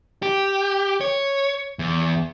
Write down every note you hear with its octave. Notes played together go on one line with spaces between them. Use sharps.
G4
C#5
E2